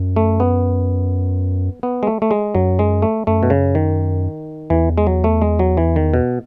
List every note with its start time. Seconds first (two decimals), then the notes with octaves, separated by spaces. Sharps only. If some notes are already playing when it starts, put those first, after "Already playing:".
Already playing: F#2
0.16 A3
0.40 B3
1.83 B3
2.03 G#3
2.07 A3
2.22 A3
2.31 G#3
2.55 F#2 F#3
2.79 G#3
3.02 A3
3.27 F#2 A3
3.43 B2
3.50 C#3
3.75 D#3
4.70 E2 E3
4.98 G#3
5.07 F#3
5.24 A3
5.42 G#3
5.59 F#3
5.77 E3
5.96 D#3
6.14 B2